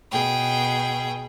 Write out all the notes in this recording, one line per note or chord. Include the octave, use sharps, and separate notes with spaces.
B2 G#4 G5